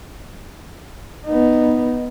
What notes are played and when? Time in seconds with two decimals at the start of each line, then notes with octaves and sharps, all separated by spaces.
1.26 B3 D#4